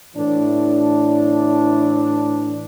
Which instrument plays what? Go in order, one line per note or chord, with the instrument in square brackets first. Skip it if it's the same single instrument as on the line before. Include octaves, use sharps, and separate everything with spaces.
[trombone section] A2 E3 D4